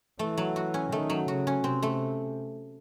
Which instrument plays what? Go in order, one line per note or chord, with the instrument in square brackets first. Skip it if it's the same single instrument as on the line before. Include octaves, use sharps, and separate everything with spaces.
[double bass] E3 [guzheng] A3
[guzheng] F#3
F#4
C#4
[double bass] D#3 [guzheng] A3
[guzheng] F#3
[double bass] C#3 [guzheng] F#4
[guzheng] C#4
[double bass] C3 [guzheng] C4
[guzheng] A3